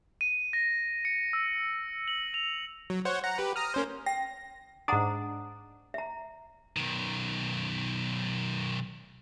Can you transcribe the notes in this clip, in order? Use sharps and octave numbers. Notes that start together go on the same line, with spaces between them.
D#7
A#6
C#7
E6
F#7
F7
F#3
C5 C#5 F#5
F#5 A#5
G4 B4
A#5 D#6 F6
A#3 C#4 C5
G5 A#6
G#2 D4 F#5 A#5 D#6
E5 A#5
B1 D#3